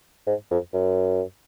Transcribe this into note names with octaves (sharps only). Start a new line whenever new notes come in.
G#2
F2
F#2